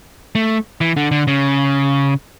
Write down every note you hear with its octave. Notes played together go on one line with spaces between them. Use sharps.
A3
E3
D3
D3
C#3